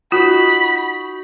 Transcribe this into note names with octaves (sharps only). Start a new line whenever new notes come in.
D#4 F4 F#4 B5